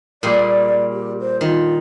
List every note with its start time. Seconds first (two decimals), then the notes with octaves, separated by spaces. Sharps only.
0.23 A#2 G3 G#4 D5
0.92 G4
1.20 C5
1.41 D#3 F4